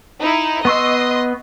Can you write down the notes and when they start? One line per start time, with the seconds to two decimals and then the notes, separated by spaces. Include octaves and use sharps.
0.22 D#4 E4
0.65 B3 D#5 C6 C#6 E6